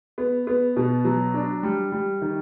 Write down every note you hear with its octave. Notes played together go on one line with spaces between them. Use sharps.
B3
B3
B2
F#3
D4
G3
G3
D#3